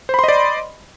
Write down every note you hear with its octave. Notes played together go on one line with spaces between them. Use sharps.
C5 D5 D#5 B5 C6